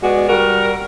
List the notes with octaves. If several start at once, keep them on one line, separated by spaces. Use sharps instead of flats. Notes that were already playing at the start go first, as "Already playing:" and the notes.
G#3 B3 F#4 D5
G3 F#4 A#4